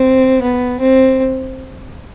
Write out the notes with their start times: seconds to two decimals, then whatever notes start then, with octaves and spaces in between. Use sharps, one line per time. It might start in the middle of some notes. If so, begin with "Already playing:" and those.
Already playing: C4
0.42 B3
0.80 C4